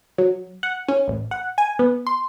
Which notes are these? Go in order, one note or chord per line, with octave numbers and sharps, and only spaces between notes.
F#3
F#5
C#4
A1
F#5
G#5
B3
C6